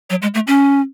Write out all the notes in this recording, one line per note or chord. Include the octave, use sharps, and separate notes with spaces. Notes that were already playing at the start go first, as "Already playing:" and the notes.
F#3
G#3
A3
C#4